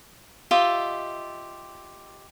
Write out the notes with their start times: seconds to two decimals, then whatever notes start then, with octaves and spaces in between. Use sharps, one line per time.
0.51 F4 G4 D#5 E5